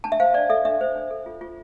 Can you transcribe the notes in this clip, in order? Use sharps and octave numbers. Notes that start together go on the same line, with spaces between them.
D4 A5
E5
C5 F5
D4 D5
A4 E5
D4 E5
C5
D4
A4
F4
F4